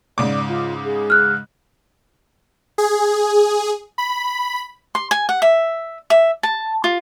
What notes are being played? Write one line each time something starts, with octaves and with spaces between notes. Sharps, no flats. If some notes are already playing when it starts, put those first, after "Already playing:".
G#2 C#3 D5 D6
F4
G#4
F6 F#6
G#4
B5
C6
G#5
F#5
E5
E5
A5
F4